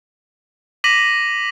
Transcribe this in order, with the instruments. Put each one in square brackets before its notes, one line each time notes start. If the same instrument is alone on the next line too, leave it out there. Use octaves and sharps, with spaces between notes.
[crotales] D6 A#6 B6 D#7 F#7